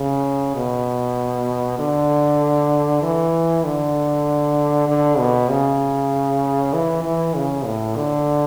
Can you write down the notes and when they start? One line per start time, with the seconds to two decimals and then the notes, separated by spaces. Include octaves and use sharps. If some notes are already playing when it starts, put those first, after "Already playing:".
Already playing: C#3
0.56 B2
1.79 D3
3.02 E3
3.64 D3
4.88 D3
5.18 B2
5.49 C#3
6.73 E3
7.04 E3
7.35 C#3
7.65 A2
7.96 D3